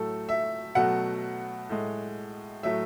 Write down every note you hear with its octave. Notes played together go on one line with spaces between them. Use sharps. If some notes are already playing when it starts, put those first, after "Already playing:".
Already playing: A2 F#3 A3 A4
E5
B2 F#3 A3 F#5
A2 G#3
A2 F#3 A3 E5